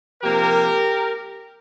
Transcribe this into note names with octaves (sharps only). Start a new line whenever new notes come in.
C3 F3 A#3 G4 A#4